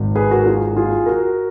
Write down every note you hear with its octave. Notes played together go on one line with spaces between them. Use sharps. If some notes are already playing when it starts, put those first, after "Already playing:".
Already playing: G#1 G#2 D#3
G#4 B4
F#4 A#4
F4 G#4
F#4
F4 G#4
F#4 A#4